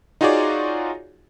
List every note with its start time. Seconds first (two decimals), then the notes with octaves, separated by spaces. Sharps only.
0.21 D#4 F4 F#4 G#4 C#5 D5